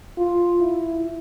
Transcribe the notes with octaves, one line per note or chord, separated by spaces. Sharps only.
F4
E4